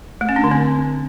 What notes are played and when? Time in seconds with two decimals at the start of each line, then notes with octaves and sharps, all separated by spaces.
0.21 A3
0.29 C#4
0.36 D4
0.44 D3
0.51 C4